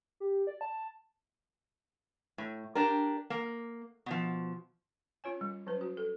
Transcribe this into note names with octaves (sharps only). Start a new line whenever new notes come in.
G4
D5
A5
A2
D4 G4 A#4
A#3
B2 F3
C#4 F4 C#5 G#5
G3
F#3 C#4 B4
F#4
A4